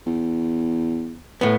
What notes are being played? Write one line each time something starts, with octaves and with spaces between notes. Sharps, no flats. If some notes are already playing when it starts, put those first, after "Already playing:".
E2
A2 B3